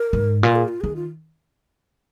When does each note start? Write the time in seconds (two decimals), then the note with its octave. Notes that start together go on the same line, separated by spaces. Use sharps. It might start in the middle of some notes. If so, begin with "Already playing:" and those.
Already playing: A#4
0.13 G#2
0.43 A#2 A#4
0.55 G#4
0.68 F4
0.81 D#3 G#4
0.96 F4